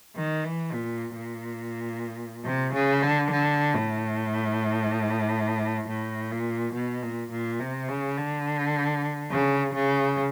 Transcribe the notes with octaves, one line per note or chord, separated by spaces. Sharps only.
D#3
E3
A#2
A#2
C3
C#3
D3
D3
A2
A2
A#2
B2
A#2
A#2
C3
C#3
D3
C#3
C#3